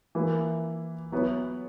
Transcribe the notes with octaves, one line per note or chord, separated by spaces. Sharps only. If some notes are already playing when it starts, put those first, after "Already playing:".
E3 A#3 E4
F#3 B3 E4 B4